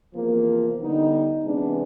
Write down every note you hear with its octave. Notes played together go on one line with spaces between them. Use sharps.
E2 C3 F3 A#3
D3 G3 B3 D#4
C3 E3 G#3 B3 D4